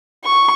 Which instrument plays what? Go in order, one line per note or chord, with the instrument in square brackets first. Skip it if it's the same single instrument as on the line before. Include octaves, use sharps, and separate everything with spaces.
[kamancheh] C#6